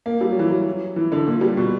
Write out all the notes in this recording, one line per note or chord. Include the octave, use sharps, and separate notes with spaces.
A#3
G3
F#3
E3
F#3
E3
D3
A#2
G3
B2